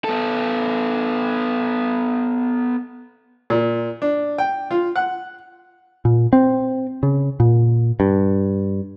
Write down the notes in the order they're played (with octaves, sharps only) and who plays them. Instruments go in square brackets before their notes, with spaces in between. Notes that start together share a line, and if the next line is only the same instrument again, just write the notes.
[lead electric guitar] B3 A4
[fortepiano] A#2
D4
G5
F4
F#5
[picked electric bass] A#2
C4
C#3
A#2
G2